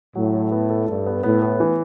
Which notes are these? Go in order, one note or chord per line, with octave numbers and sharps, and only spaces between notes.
A2 F#3
A4
B3
A4
G2 A4
B3
A2 B3
B3
E3